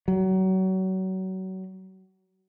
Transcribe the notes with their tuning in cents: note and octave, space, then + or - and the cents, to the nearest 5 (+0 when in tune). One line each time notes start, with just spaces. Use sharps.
F#3 +30